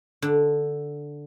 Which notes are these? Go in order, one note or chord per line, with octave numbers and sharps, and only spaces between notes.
D3